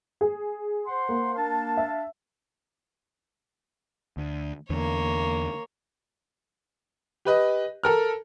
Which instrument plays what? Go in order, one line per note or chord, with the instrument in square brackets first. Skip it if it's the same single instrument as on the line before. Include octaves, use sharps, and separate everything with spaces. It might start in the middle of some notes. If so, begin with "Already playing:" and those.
[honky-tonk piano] G#4
[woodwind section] C5 F#5 C6
[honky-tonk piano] A#3
[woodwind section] D4 F5 A5
[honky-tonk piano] E5
[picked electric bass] D2
[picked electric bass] E2 D3 [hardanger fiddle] A#3 C#5
[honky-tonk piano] G4 B4 D#5
A4 A#4 F6